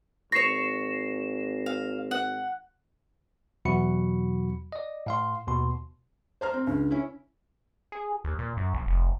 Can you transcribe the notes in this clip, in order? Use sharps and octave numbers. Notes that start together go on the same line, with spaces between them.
G#1 C#5 C#6 A#6 C7 E7
F5
F#5
E2 B2 F#3 F#4 B5 C#7
D5 D#5
A2 F5 C6
D#2 B2 C6
C5 A#5 F6
C4
C#2 D4
C#4 E4
G#4
D#2
A#2
F#2
A#1
F1